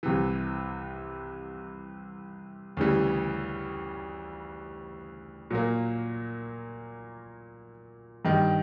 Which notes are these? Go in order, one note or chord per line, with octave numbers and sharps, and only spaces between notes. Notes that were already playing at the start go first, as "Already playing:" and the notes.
C2 C3 E3
D2 C#3 E3 G3
A#2 F#3 A#3
G2 D#3 G3